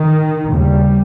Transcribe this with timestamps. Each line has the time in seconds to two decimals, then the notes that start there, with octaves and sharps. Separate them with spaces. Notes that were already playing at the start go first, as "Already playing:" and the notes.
Already playing: D#3
0.53 D#2 C#3 G3